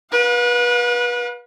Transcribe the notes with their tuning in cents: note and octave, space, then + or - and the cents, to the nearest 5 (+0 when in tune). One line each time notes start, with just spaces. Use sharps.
B4 -30 F5 +45